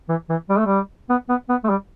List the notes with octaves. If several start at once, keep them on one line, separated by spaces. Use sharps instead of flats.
E3
E3
G3
A3
G3
B3
B3
B3
A3
G3